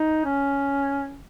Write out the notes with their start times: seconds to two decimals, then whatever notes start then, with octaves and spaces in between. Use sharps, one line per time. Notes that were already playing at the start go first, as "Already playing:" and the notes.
Already playing: D#4
0.25 C#4